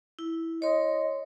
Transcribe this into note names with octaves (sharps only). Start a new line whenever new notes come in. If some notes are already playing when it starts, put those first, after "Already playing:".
E4
C#5 D#5 C6